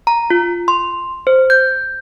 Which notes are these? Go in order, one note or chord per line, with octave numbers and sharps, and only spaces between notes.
A#5
F4
C6
C5
G6